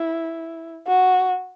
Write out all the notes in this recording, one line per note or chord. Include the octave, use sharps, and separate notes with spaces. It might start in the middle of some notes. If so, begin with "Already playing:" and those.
Already playing: E4
F#4